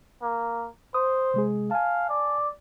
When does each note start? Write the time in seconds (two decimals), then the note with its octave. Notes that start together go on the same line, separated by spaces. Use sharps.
0.22 A#3
0.94 C5 D#6
1.34 C3 G#3 G#4
1.71 F5 G#5 A5
2.09 D5